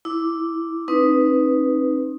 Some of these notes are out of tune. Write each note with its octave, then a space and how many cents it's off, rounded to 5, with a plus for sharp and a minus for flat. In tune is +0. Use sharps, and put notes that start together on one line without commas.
E4 +0 D6 +0
C4 +35 D#4 +0 B4 +0